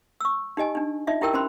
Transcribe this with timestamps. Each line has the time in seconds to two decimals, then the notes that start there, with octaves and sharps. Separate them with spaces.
0.20 C#6 E6
0.57 D#4 G4 D#5 G#5
0.75 D4 D#4
1.07 D#4 F4 D#5 E5
1.21 D#4 E4 G4 A#4 G5 E6
1.33 C#4 C5 B5 C6